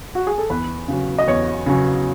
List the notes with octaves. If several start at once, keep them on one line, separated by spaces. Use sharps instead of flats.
F#4
G#4
A4
E2 B4
C#3 F#3 C#4
D#5
E2 C#5
C#3 F#3 C#4